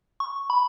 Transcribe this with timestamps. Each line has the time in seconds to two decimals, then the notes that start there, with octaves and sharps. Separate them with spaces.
0.20 C#6
0.50 B5